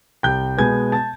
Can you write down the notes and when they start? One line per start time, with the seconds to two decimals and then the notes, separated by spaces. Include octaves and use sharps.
0.23 C2 G5 G6
0.58 B2 G#3 B3 G#5 G#6
0.92 A5 A6